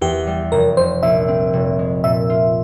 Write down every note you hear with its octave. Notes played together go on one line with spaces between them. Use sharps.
E2 G4
G3
F1 A#4
F1 C5
A#1 E5
C4
F1
G#3
A#2 E5
F4